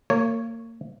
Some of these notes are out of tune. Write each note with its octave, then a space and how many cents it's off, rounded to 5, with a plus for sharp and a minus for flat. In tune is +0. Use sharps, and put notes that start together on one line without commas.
A#3 -30 C#5 +0